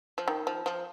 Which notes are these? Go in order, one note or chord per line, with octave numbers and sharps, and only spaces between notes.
F3
D#3
F3
F3